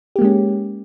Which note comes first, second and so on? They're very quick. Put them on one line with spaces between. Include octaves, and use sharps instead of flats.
G4 A#3 G#3 C#4